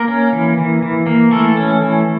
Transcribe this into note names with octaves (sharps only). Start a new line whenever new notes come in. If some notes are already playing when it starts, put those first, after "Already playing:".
Already playing: A#3 A#4
C#4
E3
E3
E3
A#3
E3 A3 A4
C#4
E3